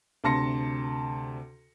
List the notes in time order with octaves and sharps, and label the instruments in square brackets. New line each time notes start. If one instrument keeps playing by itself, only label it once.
[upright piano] D2 C3 A5 C6 A#6 C#7